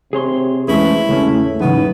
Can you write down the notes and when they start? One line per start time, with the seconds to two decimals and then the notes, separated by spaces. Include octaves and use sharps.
0.13 C3 G#4 C#5 C6
0.68 E2 E3 G#3 A3 C#4 E4 G#4
1.09 C#2 A2 A3 C#4
1.60 E2 G#2 C#3 F#3 B3 D#4